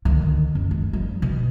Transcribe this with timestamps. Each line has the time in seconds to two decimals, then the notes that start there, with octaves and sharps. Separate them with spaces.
0.05 D2 D#3
0.55 F#2
0.71 G#3
0.93 F3 G3
1.22 B2